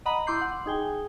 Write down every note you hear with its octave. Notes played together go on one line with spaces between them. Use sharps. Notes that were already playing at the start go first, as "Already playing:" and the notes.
D#5 F#5 A#5 B5 D#7 F#7
E4 C6 D6 G6 C7
F#5
D#4 G#4 G5 G#5